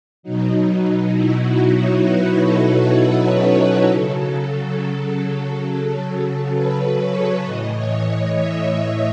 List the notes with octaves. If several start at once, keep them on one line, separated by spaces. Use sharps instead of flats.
B2 F#3 D#4
E4
F#4
C#5
B4
A4
F#4
E4
C#4
E4
C#3 F#3 A4
B4
C#5
A2 E3 D#5
C#5
D#5
E5
E5